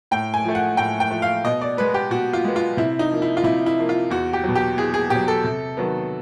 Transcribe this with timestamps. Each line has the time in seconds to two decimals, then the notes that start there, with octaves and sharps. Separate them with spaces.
0.11 A2 G5
0.34 G#5
0.44 F3 A3
0.55 F#5
0.77 A2 G5
1.00 G5
1.11 F3 A3
1.22 F5
1.44 B2 D#5
1.61 D5
1.77 G#3 B3 B4
1.94 G4
2.11 B2 F#4
2.33 F4
2.44 G#3 B3
2.56 F4
2.77 C3 E4
2.99 D#4
3.11 F3 A#3
3.22 E4
3.37 F4
3.44 C3 E4
3.66 E4
3.78 F3 A#3
3.89 F4
4.10 E2 F#4
4.33 G4
4.44 B2 F#3
4.55 G4
4.77 E2 G#4
4.94 G#4
5.10 B2 F#3 G4
5.28 A4
5.44 C3
5.77 D#3 F#3 B3